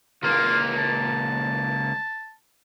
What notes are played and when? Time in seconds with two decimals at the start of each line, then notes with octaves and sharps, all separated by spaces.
0.23 C#2 A#3 F4
0.78 A5